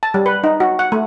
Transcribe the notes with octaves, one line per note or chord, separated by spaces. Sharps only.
A5
G3
B4
D#4
F#4
F#5
A3